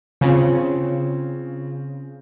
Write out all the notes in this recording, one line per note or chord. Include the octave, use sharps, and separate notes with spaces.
C#3 C4 F4 C#5